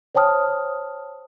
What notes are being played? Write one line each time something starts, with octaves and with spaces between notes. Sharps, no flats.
C5 C#5 G5 A5 D#6 F6